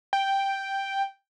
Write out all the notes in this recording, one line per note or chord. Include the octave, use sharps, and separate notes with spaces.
G5